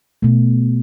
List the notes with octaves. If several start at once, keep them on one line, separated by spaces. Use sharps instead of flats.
B2 A3